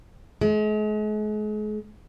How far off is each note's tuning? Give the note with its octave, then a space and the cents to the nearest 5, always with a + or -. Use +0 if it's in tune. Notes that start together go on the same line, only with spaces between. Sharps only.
G#3 +40